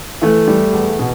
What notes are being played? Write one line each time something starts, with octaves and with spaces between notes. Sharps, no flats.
E3 A3
G3
E2
B2